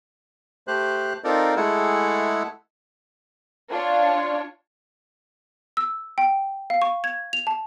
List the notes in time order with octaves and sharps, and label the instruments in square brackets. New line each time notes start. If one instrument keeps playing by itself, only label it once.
[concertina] A3 G4 C5 F#6
C4 D#4 F4 A4 A#4 D5
G#3 A3 E4 G#4 A4 F#5
[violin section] D4 F4 C#5
[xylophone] E6
G5
F5
C#6
G#6
F7
A5